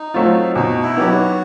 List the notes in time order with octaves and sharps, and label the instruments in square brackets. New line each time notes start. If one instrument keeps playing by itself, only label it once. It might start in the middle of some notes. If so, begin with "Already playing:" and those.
Already playing: [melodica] D#4
[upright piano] F#3 A3 C4 F4
[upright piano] B2 [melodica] D#4
[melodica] E4
[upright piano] F#3 B3 D#4 [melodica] G4
[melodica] F#4